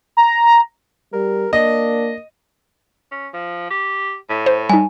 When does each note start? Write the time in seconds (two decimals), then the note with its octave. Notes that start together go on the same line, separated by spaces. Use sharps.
0.17 A#5
1.13 G3 A#4
1.53 A#3 D4 D#5
3.12 C#4
3.34 F3
3.71 G4
4.30 A2
4.46 C5
4.70 G3 D#4 G#5